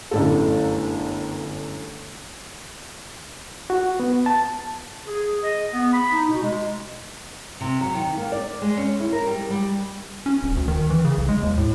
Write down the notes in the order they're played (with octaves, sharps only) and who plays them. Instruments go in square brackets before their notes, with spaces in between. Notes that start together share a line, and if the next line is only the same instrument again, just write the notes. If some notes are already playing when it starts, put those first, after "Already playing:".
[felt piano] G1 F#2 A2 A4
[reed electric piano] F#4
B3
A5
[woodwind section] G#4
D#5
B3
B5
D#4
B2
G#3
[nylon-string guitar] C3
F#3
D#3
A#3
D5
G#3
C#4
E4
A#4
G3
G3
[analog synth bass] C#4
D#1
D2
D#3
E3
C#3
B1
G#3
D#2
A2